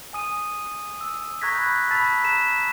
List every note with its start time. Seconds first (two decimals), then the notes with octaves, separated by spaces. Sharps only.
0.13 G#5 D#6 D#7
1.01 E6
1.42 A#5 C#6 F#6 G#6 A#6 B6
1.54 B5 F#6 G6
1.91 A5 B5 E6 A6 B6
2.24 A#5 F#6 B6 E7